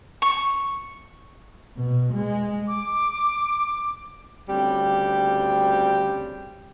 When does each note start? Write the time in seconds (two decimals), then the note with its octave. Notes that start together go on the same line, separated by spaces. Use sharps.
0.22 C#6
1.77 B2
2.14 G#3
2.68 D6
4.49 D2 C#3 G3 C4 G4